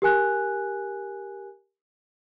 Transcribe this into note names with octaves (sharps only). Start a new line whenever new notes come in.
G4 A#4 G#5 F#6